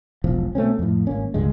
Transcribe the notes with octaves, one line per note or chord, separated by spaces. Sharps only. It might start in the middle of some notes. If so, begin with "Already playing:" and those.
E1 B1 F3
B2 A3 C4 C#4
F2 A2
G#1 A#3 C#4
D1 C#2 G2 G#3